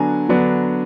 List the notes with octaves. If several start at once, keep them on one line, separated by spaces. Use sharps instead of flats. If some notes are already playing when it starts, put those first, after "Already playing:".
Already playing: D3 F#3 B3 D4 G#5 A#5
D3 F#3 B3 D4